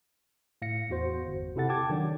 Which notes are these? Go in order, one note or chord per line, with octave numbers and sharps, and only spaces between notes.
A2 F5 A#6 C#7
E2 F#4 C5
G1
C3 E4 G4 A4 F#5 A6
G5 A5 D6 G#6
D#3 F#3 D4